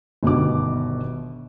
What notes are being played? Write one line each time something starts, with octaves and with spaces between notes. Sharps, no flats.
G1 B2 D#3 D6